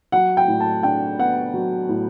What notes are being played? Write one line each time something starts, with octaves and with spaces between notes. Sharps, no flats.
F#3 F#5
G5
A2
A5
D4 G5
B3 F#5
F#3
A2